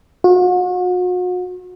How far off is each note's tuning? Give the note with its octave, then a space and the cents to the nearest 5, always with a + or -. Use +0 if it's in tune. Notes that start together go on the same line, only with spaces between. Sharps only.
F#4 -40